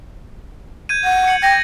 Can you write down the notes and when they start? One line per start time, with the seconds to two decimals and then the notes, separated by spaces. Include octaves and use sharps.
0.89 G6 G#6 D#7
1.04 F#5
1.28 C#7 F#7
1.42 G5 G#6 A#6